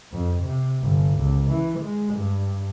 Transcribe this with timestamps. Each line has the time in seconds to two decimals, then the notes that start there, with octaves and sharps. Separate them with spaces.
0.12 F2
0.43 C3
0.82 G1
1.18 C#2
1.50 E3
1.79 G#3
2.14 G2